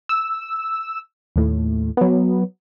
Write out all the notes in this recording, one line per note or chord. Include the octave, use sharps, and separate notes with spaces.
E6
D#2 A2
F#3 B3